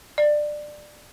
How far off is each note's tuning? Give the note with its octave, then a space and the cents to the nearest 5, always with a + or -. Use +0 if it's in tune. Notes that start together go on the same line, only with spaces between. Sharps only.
D5 +20